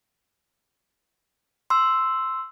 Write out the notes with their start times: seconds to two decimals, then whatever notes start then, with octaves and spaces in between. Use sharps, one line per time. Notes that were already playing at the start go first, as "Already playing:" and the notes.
1.70 C6 E6